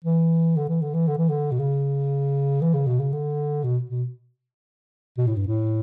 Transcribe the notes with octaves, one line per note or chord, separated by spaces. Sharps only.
E3
D3
E3
D3
E3
D3
E3
D3
B2
C#3
E3
C#3
B2
C#3
D3
B2
B2
B2
A2
G2
A2